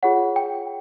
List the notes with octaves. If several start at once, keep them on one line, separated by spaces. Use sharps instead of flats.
F4 G#4 C#5 F#5
G5